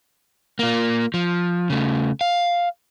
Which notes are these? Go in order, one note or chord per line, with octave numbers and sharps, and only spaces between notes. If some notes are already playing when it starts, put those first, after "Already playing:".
A#3 F4
F3
C#3 A3
F5